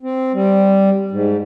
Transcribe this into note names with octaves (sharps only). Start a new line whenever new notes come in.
C4
G3
G#2